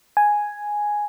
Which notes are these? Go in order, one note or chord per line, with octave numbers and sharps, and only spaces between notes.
G#5